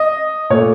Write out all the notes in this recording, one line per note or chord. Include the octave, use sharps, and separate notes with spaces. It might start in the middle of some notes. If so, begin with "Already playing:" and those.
Already playing: D#5
A#2 A3 C#5